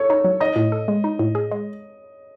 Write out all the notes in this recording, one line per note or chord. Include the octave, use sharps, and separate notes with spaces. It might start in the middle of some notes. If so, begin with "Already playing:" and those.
Already playing: A4 C#5
D#4
F#3
D#4 D#5
A2
A4
G#3
D#4
A2
G#4
G#3